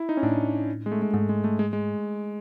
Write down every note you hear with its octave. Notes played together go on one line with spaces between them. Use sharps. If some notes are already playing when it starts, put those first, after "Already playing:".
Already playing: E4
D#4
C#4
A2 D4
G#3
A3
G#3
G#2 A3
G#3
A3
G#3
G#3